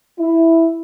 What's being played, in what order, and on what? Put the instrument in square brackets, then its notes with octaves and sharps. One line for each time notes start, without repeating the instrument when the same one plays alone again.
[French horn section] E4